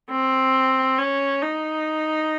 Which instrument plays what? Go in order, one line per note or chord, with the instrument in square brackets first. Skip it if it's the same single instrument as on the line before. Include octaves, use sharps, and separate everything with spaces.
[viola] C4
C#4
D#4